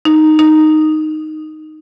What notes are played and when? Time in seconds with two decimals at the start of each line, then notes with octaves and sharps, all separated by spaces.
0.05 D#4
0.39 D#4